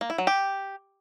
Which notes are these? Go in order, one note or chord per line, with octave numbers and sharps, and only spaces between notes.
A#3
E4
F#3
G4